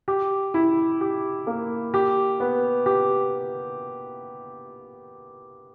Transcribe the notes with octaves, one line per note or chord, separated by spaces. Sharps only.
G4
E4
G4
A#3
G4
B3
G4